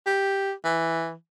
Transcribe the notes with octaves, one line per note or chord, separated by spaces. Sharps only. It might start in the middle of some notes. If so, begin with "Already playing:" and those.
G4
E3